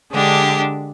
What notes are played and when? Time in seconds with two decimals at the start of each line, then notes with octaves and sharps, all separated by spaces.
0.12 D3 G#3 D4 G4